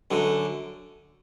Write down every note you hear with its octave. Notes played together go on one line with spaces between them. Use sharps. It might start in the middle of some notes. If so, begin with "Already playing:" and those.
F#2 D3